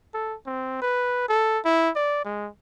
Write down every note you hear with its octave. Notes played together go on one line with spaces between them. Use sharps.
A4
C4
B4
A4
E4
D5
G#3